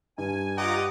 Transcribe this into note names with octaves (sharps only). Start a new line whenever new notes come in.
G2 G#5
F4 G4 D#5 F#5 A#5 D6